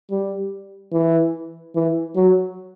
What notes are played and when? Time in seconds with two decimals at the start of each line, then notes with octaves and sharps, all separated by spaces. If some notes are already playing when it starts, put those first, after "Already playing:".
0.11 G3
0.93 E3
1.75 E3
2.16 F#3